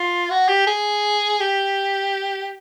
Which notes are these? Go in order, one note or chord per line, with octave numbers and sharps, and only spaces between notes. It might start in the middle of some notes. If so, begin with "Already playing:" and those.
Already playing: F4
F#4
G4
G#4
G4